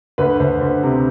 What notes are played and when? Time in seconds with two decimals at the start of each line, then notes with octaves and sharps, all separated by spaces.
0.18 D2 B4
0.40 D2 C5
0.61 D2
0.83 C3